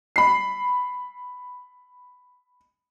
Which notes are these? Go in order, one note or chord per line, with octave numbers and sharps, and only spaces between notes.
B5 C7